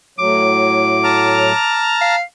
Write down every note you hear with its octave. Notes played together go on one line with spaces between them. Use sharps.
A2 F#3 D6
A5 A#5 F6
F5